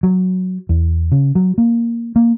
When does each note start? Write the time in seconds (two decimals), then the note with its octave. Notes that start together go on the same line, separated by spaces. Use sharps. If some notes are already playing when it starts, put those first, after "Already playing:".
0.03 F#3
0.69 E2
1.12 C#3
1.35 F#3
1.58 A#3
2.16 A#3